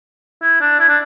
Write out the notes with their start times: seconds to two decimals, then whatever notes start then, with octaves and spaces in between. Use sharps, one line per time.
0.42 E4
0.61 D4
0.79 E4
0.88 D4